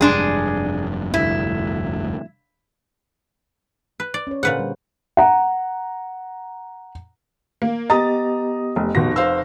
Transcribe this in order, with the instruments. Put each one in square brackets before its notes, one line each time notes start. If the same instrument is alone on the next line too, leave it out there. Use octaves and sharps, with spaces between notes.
[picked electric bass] F1 G2 [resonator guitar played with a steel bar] G#3 D4 G#4
[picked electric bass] F1 D2 G2 [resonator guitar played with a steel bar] E4
[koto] B4
D5
[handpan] C#4 C#5
[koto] A#2 B4 F#5 [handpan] D3 G#4 C5
[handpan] G3
[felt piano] F#5 A#5
[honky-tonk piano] A#3
[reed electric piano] B3 G4 D#5 [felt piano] A#5 D#6 [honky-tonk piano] A6
[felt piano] F1
[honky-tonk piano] F1 A#6 [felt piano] B2
[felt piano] C5 F5 E6